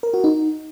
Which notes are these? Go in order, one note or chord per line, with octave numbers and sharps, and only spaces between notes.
A#4
F#4
D#4